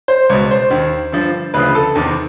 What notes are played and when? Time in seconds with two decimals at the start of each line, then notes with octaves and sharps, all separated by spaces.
0.08 C5
0.30 C#2 B2 C#5
0.51 C5
0.71 D#2 D#3
1.12 G2 D3 F3
1.54 D2 C#3 F3 B4
1.75 A4
1.95 E2 C3 D#3